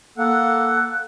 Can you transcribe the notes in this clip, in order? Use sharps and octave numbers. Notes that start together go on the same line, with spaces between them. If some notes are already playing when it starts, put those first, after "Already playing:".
A#3 A4 F#5 F#6